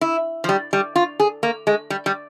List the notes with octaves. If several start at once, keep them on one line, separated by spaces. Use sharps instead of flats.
E4
F3
G3
G3
F4
G#4
A#3
G#3
G3
G3